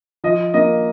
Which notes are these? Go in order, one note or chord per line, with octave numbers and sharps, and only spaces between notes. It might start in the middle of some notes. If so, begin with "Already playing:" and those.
F3 D#5
A#3 D#5